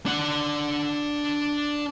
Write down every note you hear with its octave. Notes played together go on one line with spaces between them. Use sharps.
D4 F#5